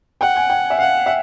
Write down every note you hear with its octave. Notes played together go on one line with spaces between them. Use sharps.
F#5 G5
G#5
G5
E5
F5 F#5
E5